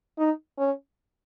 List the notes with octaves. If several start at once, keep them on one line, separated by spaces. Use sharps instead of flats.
D#4
C#4